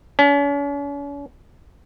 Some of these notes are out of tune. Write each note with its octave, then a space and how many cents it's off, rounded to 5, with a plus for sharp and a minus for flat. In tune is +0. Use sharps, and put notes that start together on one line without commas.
C#4 +40